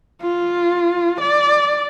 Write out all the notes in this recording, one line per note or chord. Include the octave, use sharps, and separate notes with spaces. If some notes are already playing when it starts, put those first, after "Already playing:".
F4
D5